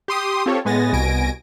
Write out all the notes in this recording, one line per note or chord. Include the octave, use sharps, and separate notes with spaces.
G4 C6 D#6
C4 F4 G4 A4 C#5
A2 G#3 B3 G#5 A6 A#6
C2 B2 G#5 A#6 D7